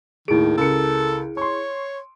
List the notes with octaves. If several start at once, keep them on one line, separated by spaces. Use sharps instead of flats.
D#2 A2 D#3 E4 G#4 D7
C#2 A4 A#4 C#7
C#5 C6 C#6